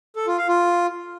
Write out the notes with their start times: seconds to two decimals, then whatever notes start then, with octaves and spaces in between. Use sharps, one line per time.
0.16 A4
0.27 F4
0.38 F5
0.48 F4